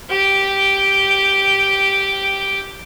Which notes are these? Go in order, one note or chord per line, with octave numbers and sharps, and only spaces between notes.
G4 G5